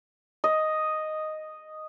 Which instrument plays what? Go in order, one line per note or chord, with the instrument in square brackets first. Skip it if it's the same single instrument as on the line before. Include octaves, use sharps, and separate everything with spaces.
[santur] D#5